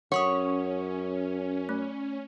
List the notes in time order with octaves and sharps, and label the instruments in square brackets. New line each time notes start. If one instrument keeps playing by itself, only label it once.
[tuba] F#2 [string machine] C#4 [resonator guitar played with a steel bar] C#5 [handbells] F#5 C#6 D#6
[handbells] A3